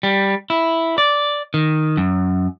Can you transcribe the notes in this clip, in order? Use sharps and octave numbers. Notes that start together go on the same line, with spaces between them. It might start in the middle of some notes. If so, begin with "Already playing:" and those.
G3
E4
D5
D#3
F#2